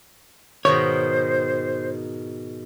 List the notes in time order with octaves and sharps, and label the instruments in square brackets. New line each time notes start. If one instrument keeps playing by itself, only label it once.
[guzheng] G#2 B2 D#3 [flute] C5 [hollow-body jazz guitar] C#5